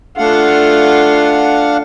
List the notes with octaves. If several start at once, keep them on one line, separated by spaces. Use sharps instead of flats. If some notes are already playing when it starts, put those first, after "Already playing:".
A3 D4 F4 F5 F#5